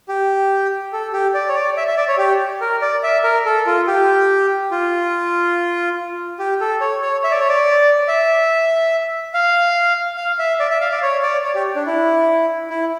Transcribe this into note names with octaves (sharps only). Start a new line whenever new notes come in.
G4
A4
G4
D5
C#5
D5
E5
E5
D5
C#5
G4
A#4
D5
E5
A#4
A4
F4
G4
F4
G4
A4
C#5
C#5
E5
D5
C#5
D5
E5
F5
F5
E5
D5
E5
F5
D5
C#5
D5
C#5
G4
D4
E4
E4